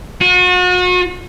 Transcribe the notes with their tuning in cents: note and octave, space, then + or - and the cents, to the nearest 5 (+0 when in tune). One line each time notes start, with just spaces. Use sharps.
F#4 -40